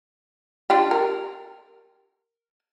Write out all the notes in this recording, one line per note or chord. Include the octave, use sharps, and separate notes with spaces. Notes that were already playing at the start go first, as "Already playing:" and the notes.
D4 F4 G4
A#4